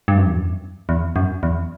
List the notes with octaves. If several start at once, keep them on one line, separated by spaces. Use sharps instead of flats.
G2
F#2
E2
F#2
E2
F#2
E2